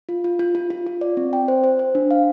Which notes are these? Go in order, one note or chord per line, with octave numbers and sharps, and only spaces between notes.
F4
F4
F4
F4
F4
F4
D5
C4
G5
C5
C5
C5
D4
F5